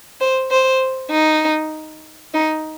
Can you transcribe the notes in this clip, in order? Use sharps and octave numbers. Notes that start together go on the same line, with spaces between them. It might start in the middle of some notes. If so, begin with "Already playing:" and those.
C5
C5
D#4
D#4